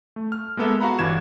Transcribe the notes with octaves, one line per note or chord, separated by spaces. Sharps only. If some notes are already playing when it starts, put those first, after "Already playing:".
A3
F6
G#3 A#3 B3 A4 E5
F#4 F5 F#5 A#5 B5
G1 G2 E3 G#6 E7